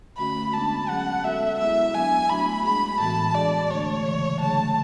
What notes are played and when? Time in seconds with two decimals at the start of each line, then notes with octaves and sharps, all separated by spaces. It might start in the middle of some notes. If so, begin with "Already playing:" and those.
0.18 D3 A3 C#4 F#4 B5
0.53 G#3 B3 D4 A5
0.89 F#3 C#4 G#4 F#5
1.23 G#3 B3 F#4 A4 E5
1.58 G#3 B3 E4 G#4 E5
1.94 F#3 B3 D4 G#5
2.29 F#3 A3 D4 F#4 B5
2.64 G#3 D4 G#4 B5
2.99 A2 E3 B3 F#4 A5
3.34 G#3 D4 G#4 D5
3.70 D3 A3 D4 C#5
4.04 C#3 E3 G#3
4.40 D3 F#3 A3 D4 G#4 A5